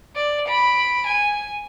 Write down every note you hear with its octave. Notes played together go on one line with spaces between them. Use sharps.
D5
B5 D7
G#5